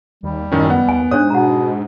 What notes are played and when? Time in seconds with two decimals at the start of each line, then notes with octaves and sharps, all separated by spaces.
0.23 D#2 G3
0.52 A1 F#2 D#3 C#4
0.69 B3 F#5
0.88 D#2 G#5
1.11 G#2 D4 C5 C#5 D#6
1.30 B2 F#5 A#5